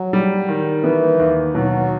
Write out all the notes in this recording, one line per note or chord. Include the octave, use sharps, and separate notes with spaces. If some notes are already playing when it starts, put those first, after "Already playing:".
Already playing: F#3
G3
D#3
E3 B3
D#2
B2 F#3